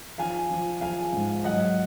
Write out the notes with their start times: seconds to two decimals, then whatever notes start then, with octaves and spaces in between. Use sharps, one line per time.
0.18 F3 F5 G#5
0.50 F3
0.81 F3 F5 G#5
1.13 G#2
1.44 F#3 D#5 F#5